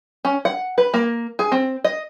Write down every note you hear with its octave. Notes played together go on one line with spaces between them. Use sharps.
C#4
F#5
B4
A#3
G#4
C4
D#5